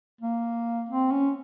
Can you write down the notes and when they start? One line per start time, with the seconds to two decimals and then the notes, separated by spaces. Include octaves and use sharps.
0.21 A#3
0.89 C4
1.11 C#4